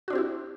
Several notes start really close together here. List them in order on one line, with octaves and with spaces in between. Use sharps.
F#4 D4 C4 G4 E4